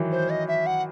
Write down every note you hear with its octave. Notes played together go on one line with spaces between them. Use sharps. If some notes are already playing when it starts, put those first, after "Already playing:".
Already playing: D#3 E3 F#3
C5
D#5
E5
F#5